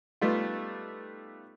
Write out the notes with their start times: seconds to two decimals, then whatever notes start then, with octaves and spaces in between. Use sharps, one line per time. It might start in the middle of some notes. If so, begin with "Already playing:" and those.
0.21 G3 A3 B3 D#4 F4